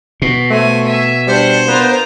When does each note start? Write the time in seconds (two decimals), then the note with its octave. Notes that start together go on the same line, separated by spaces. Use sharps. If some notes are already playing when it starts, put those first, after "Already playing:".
0.22 B2
0.50 A3 C5 G#5
0.86 E5 G#5
1.27 G3 D4 C5 C#7
1.68 B3 F4 A#4